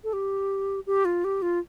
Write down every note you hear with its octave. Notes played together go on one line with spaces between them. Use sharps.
A4
G4
G4
F4
G4
F4